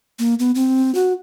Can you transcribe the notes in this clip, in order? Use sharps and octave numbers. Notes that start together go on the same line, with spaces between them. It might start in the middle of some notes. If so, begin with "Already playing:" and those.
A#3
B3
C4
F#4